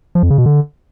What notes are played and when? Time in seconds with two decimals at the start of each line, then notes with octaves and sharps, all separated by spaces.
0.15 F3
0.23 F2
0.30 C#3
0.38 B2
0.46 D3